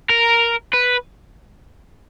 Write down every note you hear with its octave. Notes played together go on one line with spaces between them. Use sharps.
A#4
B4